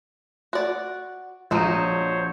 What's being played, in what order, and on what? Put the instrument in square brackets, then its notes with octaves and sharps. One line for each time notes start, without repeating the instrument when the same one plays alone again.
[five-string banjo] F#4 D5
[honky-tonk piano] A#1 D#7 [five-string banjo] F3 F#3 D#4 [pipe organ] C5 C#5